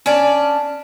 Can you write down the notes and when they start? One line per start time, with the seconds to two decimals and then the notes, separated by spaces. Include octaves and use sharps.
0.06 C#4 D4 D5